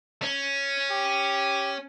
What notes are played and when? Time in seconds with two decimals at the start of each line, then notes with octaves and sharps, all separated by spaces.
0.22 C#4
0.90 G4